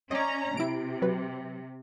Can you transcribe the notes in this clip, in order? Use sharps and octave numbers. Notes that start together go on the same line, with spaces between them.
C#4 D5 D#5 A#5
C3 E4 D7
F#3 B4